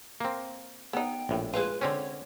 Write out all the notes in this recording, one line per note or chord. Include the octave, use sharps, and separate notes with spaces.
A#3 C4
B3 D#4 G5
A#1 A2
G#3 F4 B4
D3 C4 C#4 C#5